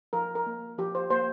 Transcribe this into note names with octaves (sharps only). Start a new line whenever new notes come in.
F3 A#4
A#4
A#3
F3 G4
C5
A#3 C5